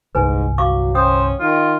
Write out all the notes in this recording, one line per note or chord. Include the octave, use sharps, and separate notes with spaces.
G1 C2 G#2 B4 G#5
F#3 F5 C#6 D6
C#4 C5 G5 D#6
D#3 F4